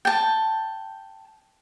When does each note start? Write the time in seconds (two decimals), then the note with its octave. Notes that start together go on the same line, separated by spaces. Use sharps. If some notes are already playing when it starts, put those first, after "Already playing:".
0.05 G5 A5